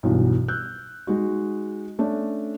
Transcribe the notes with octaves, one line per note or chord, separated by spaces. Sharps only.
B1 E2 G2 B2
E6 F#6 G6
G#3 D#4 F#4
A3 C#4 D4 D5